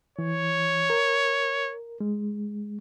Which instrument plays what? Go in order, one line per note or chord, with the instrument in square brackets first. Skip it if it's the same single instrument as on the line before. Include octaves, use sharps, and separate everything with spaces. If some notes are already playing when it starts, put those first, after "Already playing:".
[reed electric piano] E3 [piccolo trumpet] C#5
[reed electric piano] A#4
G#3